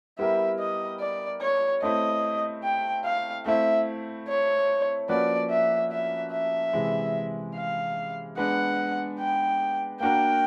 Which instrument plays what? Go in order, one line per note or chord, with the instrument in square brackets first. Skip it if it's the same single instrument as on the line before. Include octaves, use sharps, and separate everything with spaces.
[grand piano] G3 B3 E4 G4 A#4 [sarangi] E5
[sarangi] D#5
D5
C#5
[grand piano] A3 C4 E4 [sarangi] D#5
[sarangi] G5
F5
[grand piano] A3 C4 E4 [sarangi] E5
[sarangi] C#5
[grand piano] F3 A#3 C#4 F#4 B4 [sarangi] D5
[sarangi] E5
E5
E5
[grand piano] C3 E3 G#3
[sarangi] F5
[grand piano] G#3 B3 D4 [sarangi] F#5
[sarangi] G5
[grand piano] A#3 D4 F#4 A#4 [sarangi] G5